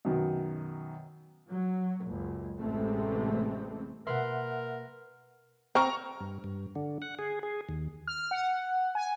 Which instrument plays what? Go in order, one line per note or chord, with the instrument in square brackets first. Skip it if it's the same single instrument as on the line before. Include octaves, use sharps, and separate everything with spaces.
[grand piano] F#2 B2 D#3
[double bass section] F#3
F#1 C#2
A1 E2 C3 G#3 A3 C4
[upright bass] B2 A#3 [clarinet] A#4 [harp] B4 C6 [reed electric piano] E5 F#5
[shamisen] C4 [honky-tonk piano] A#5 C#6 F6
[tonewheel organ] G2
G2
D3
F#5
G#4
G#4
D#2
[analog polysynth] F6
F#5
G#5